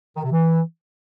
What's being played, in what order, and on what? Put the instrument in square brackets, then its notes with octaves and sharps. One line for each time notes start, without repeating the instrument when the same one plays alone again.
[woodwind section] D#3
C3
E3